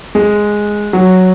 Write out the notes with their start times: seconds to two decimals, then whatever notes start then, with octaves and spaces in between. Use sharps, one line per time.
0.15 G#3
0.93 F#3